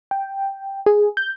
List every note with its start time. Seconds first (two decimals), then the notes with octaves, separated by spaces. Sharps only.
0.11 G5
0.86 G#4
1.17 G6